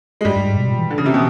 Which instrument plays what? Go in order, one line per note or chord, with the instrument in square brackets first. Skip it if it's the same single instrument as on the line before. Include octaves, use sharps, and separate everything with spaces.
[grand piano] G#3
[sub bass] G2 [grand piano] G3
[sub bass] G2
G#2
B2
A#2
E3
[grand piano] D3
C#3
C3
B2